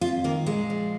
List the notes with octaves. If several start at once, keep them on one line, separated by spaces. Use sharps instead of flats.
F2 F4
D#3 A#3
A#2 G#3
F3